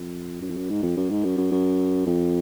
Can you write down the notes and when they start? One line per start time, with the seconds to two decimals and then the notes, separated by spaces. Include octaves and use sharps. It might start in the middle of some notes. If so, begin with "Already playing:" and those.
Already playing: F2
0.41 F#2
0.49 F2
0.56 F#2
0.70 G#2
0.82 F2
0.97 F#2
1.10 G#2
1.24 F#2
1.37 F#2
1.51 F#2
2.06 F2